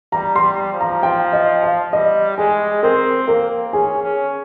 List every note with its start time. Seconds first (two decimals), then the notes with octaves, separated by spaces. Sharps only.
0.12 G3 A#5
0.36 C6
0.42 G3
0.73 F3
0.81 A#5
1.03 G5
1.33 D#5
1.63 F5
1.93 G3 D#5
2.38 G#3 G#4
2.83 C4 A#4
3.28 A#3 A#4
3.73 C#4 G#4
4.03 C#4